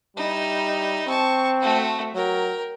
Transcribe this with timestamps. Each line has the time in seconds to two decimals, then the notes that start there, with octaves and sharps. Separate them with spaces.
0.17 G3 D#4 E4
1.07 C4 A5 C#6
1.61 A3 F#4
2.15 F#3 A#4 G5